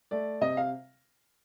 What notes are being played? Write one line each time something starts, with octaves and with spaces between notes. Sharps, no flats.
A3 D5
C3 D#5
F5